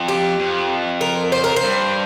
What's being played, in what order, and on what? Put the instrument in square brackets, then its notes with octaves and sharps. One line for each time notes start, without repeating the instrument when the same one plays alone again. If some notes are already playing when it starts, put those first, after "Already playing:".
Already playing: [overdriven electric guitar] F2
[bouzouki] G4
[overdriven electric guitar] F2
[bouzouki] A#4
C5
A#4
C5
[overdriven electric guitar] G2